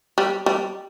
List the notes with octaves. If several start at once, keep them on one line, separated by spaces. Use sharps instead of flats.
G3
G3